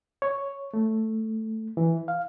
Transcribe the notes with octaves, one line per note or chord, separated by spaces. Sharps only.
C#5
A3
E3
F5